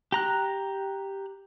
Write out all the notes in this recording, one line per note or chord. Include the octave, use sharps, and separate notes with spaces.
G4 A#5 F#6